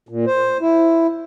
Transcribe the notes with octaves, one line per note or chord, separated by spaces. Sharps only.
A#2
C5
E4